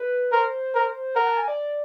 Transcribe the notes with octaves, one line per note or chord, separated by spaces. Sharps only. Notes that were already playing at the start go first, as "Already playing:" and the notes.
Already playing: B4
A#4 C5
A#4
A#4 F#5
A5
G#5
D5